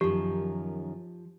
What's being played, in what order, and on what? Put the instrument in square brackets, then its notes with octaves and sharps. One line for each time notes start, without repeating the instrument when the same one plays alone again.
[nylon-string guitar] F#2 D#3 [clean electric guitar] F3 [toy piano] G4